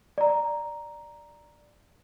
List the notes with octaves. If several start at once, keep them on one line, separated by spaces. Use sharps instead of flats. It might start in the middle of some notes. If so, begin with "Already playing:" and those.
D5 A#5